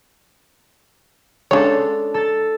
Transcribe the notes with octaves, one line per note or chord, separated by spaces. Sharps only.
C#3 G#3 D4 A4 C#5
A4 A6